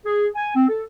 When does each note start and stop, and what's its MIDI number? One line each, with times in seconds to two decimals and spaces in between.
0.04 0.28 68
0.35 0.50 80
0.55 0.65 60
0.68 0.83 69